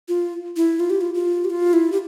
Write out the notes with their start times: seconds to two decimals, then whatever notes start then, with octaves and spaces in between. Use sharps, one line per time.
0.08 F4
0.56 E4
0.80 F4
0.90 G4
1.01 F4
1.14 F4
1.45 G4
1.50 F4
1.73 E4
1.92 G4